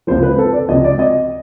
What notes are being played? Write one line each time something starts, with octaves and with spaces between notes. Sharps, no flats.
C#2 C3 F3 C5
B4
A4
D5
C#2 C3 F3 D#5
D5
D#5